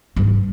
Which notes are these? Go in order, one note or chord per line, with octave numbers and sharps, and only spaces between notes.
G2